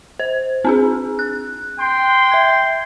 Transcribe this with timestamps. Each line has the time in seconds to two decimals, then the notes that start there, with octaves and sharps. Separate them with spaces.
0.19 C5
0.65 C4 D4 G#4
1.19 F#6
1.79 G5 C6
2.32 E5 G#6